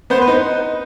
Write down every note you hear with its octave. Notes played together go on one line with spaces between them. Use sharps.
B3 C5
B4
D#4